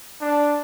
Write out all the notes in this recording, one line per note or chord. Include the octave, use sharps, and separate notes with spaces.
D4